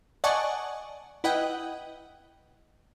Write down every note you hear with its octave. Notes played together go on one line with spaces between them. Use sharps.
D5 D#5 F#5 G#5 A5 C#6
E4 B4 D#5 F#5 G5